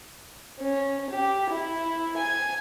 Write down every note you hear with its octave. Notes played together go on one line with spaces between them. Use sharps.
C#4
G4
E4
G#5